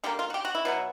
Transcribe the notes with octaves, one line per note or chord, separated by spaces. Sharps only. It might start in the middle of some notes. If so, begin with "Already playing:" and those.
D3 G3 A#3 G4
F4
F#4
G4
F#4
E4
B2 F#3 B3